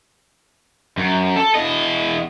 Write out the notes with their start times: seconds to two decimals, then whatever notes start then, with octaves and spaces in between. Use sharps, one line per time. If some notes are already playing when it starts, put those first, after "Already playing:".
0.98 F#2
1.36 A4
1.55 E2 D#5